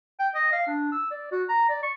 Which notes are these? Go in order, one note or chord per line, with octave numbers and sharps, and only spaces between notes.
G5
D#5
F5
D4
E6
D5
F#4
A#5
D5
C#6